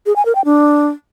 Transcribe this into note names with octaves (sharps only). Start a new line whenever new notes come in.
G#4
G#5
A#4
G5
D4